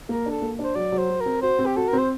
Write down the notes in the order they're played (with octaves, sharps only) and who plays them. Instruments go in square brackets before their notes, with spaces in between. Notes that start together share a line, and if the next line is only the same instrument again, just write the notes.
[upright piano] A#3 [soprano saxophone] A#4
[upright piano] D4 [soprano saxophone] A4
[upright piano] A#3
[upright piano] D4 [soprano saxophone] C5
[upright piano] F#3 [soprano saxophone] D5
[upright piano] F#3
[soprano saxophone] C5
[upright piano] F#4
[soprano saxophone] A#4
[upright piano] C4
[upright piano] F#4 [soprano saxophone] C5
[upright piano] C4
[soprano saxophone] G4
[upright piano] F#4 [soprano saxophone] A4
[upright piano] C4 [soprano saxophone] A#4
[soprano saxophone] C5